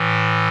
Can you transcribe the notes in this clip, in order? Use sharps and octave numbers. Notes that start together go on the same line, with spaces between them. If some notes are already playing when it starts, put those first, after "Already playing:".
Already playing: A2 E3